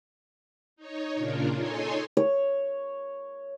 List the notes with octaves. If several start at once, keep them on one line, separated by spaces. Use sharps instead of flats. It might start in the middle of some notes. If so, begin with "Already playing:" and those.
D#4 C#5
A#2 C#3 D4 F4 A#4
D#4 A4 C#5 G#5 C6
C#5